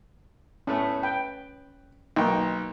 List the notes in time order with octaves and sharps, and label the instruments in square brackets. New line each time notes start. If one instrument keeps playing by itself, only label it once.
[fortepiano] A2 A3 B3 [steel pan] C#4
[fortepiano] B4 [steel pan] G5
[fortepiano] B1 G5 C#6 [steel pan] A#3 D#4